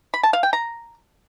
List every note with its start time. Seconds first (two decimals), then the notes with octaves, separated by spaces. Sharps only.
0.14 B5
0.23 A5
0.33 F5
0.43 G5
0.53 A#5